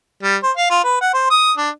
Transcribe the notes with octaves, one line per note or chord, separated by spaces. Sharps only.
G3
C5
F5
F4
B4
F#5
C5
D#6
D4